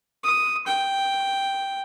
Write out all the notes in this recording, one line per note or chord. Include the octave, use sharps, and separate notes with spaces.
D#6
G5